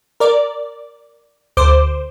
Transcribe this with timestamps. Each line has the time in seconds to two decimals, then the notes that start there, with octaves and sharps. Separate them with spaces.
0.20 A#4 D5
1.57 D2 C5 D6